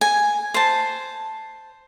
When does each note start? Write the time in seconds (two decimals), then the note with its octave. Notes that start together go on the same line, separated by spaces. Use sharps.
0.01 G#5
0.54 C5 A5